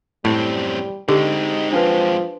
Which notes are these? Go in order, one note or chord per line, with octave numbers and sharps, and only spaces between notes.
F#2 A2 G3 C4
D3 G#3 C4 D#4 G4
F3 D4 B4